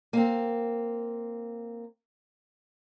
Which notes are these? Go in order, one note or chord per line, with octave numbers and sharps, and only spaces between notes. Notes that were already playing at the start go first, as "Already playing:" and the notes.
A#3 C4